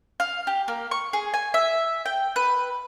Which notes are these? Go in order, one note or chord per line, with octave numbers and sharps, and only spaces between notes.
F5
G4
A#3
C#6
G#4
G#5
E5
G5
B4